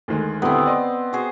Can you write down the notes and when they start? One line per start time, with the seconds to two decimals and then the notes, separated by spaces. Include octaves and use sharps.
0.08 D2 D#3 G#3
0.42 D#1 D3 B3 C4 E4
0.66 D5 D#5 C6
1.13 F#4 G#4 C5